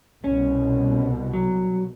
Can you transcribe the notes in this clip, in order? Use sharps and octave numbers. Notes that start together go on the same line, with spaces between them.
C2 B2 C#4
F#3